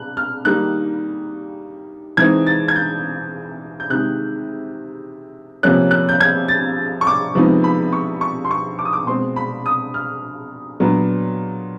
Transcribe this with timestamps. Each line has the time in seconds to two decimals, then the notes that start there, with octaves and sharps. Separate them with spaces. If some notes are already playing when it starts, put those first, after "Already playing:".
Already playing: F#6
0.17 F6
0.45 D#3 G3 A#3 D#4 F#6
2.17 E3 G#3 C4 D#4 G#6
2.47 A6
2.68 G#6
2.76 G6
3.80 G6
3.90 C3 D#3 G#3 F#6
5.63 C3 F3 A#3 C#4 F#6
5.91 F#6
6.09 G6
6.20 G#6
6.48 A6
7.01 C#6
7.07 D6
7.35 C3 F3 G#3 B3 D#4
7.64 B5
7.93 C#6
8.21 C#6
8.45 C6
8.51 C#6
8.79 D6
8.85 D#6
8.93 D6
9.07 B2 G#3 C4 C6
9.36 B5
9.66 D#6
9.94 F6
10.80 A#2 F#3 B3 D4